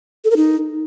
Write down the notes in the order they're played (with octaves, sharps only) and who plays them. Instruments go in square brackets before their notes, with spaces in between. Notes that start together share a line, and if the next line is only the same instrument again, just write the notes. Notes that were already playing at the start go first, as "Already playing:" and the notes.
[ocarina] A4
A#4
D#4